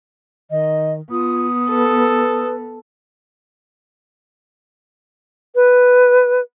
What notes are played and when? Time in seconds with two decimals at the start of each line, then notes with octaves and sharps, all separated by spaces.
0.50 D#3 D#5
1.11 B3 F4 D#6
1.70 A4 B4
5.55 B4